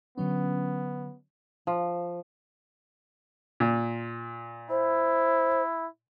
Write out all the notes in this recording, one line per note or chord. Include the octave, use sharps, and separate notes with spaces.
D3 F#3 B3 C#4
F3
A#2
E4 C5